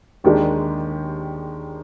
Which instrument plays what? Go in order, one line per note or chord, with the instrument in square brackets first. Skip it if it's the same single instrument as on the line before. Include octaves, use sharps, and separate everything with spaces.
[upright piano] D#2 D#3 G#3 D4 G4